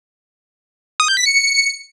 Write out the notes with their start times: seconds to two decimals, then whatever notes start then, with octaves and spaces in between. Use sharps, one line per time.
1.00 D#6
1.08 G6
1.17 B6
1.26 C#7